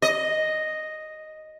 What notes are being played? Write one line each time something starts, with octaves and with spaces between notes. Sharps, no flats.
D#5